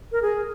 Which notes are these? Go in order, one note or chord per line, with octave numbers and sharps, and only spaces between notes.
A#4
G#4